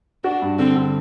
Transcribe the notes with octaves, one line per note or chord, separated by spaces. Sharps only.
D4 F#4
G2
D3 C4
D3